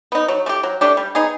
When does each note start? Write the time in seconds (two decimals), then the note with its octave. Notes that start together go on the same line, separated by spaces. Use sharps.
0.12 B3 D#4
0.28 F#3
0.46 A3 D4 G4
0.63 F#3
0.81 A3 D4 G4
0.97 G3
1.15 B3 D#4 G#4